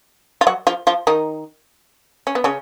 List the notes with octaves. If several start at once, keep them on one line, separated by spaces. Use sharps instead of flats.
F4
F#3 F#4
F3 F4
F3 F4
D#3 D#4
C#4
B3
C#3 C#4